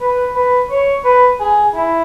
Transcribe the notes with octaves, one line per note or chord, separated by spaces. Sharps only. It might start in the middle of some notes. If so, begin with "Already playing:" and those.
B4
B4
C#5
B4
G#4
E4